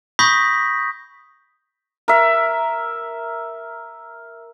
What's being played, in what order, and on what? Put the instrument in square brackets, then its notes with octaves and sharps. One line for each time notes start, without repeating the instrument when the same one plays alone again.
[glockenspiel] B5 C#6 D#6 G6 A#6 B6
[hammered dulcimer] A#4 E5